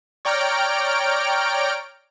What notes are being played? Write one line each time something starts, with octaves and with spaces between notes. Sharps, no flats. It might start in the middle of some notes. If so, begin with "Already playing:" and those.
C#5 D5 G5 A#5 F6 D7